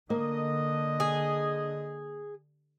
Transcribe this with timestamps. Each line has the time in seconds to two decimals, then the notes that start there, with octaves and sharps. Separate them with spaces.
0.10 D3 A#3 D#5
1.00 G#4